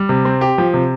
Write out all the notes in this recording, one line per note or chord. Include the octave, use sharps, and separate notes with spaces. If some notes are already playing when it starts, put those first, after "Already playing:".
Already playing: G3
C3
C4
G4
F3
C3